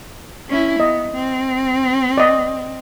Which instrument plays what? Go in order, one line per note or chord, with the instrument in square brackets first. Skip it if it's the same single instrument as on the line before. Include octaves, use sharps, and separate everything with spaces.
[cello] C#4 E4
[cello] B3 [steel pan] D#5
[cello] C4
[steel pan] D5 D#5